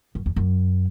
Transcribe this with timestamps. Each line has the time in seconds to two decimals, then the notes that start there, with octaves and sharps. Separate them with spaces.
0.15 F#2
0.26 E2
0.36 F#2